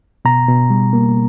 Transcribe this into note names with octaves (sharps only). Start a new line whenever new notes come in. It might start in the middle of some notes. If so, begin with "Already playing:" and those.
B2 A#5
B2
G3
A#3